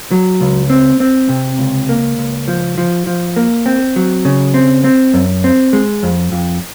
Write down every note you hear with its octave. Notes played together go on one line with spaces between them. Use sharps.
F#3
C#2
C4
C4
C3
C#2
A#3
C#2
F3
F3
F3
A#3
C4
F#3
C#3
C4
C4
F#2
C4
G#3
F2
F2